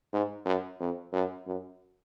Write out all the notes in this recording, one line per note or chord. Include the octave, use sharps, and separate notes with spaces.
G#2
F#2
F2
F#2
F#2